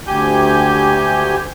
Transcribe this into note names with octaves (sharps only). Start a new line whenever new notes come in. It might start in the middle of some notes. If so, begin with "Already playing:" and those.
D2 G4 G#5 G6